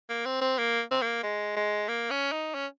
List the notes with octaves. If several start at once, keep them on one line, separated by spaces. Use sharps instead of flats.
A#3
C4
C4
A#3
C4
A#3
G#3
G#3
A#3
C#4
D#4
C#4